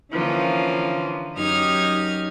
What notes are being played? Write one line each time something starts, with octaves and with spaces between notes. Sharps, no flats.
D3 E3 F3 A#3 C#4
F#2 D#4 G4 D#6 F6 G#6